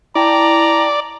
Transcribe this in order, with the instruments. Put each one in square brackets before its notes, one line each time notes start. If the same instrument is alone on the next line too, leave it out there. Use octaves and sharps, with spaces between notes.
[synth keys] E4 G5 A5 [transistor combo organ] D5 [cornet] A#5